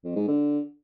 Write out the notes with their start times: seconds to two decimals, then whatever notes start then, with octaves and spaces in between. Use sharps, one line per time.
0.04 F2
0.16 G#2
0.28 D3